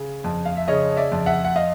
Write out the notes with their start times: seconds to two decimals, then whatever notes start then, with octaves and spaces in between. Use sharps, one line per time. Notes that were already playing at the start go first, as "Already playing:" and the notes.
Already playing: C#3
0.24 F2
0.45 F5
0.57 E5
0.68 C#3 C#5 D#5
0.97 D5 E5
1.12 F2
1.26 E5 F#5
1.45 F#5
1.56 D#5 F5